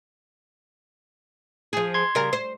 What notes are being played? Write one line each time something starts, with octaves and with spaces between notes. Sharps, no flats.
F3 G#4
C6 G#6
C#3 G3 A#4
C5